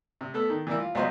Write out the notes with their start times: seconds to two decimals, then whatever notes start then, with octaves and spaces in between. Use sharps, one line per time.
0.21 C3
0.34 A3 B3 A4
0.50 D#3
0.67 E3 G3 A#3 E4
0.79 F4
0.95 C#2 F#3 B3 F4 C5 D#5